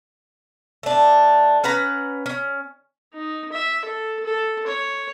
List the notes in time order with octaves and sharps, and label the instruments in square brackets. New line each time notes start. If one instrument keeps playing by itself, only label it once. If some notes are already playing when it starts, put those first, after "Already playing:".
[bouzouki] A3 D4
C#4 B4 F#5 A#5
C#4
[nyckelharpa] D#4
E5
A4
A4
C#5